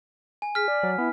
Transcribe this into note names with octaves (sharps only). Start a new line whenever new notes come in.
G#5
G#4 F6 B6
D5
F#3
B3 E4